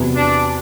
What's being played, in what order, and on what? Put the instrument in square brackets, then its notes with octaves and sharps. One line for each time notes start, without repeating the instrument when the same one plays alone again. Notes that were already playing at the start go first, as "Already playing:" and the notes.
Already playing: [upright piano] E2 C3 F#3 B3 E4
[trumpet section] D4